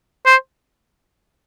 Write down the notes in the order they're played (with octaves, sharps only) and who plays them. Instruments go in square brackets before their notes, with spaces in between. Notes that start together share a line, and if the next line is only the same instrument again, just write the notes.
[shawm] C5